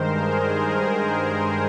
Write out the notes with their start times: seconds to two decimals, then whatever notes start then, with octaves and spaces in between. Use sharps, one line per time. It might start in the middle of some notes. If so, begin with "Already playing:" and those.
Already playing: G2 D#3 G#3 A#4 C5
0.20 G#4
0.55 A#4